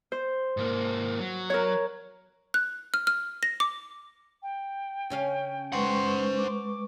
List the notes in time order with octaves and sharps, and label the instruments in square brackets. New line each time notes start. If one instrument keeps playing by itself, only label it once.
[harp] C5
[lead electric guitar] G#2 A#3
F#3
[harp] A#4 C#5
[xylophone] F#6
F6
F6
A#6
D6
[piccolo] G5
[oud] C#3 C#4 F5
[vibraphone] G#3 B4 C#6 [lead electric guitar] C5 F#5
[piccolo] D6